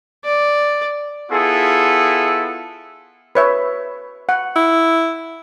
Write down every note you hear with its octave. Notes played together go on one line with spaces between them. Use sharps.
D5
B3 E4 F4 G#4 A4
B4 C#5 E5
F#5
E4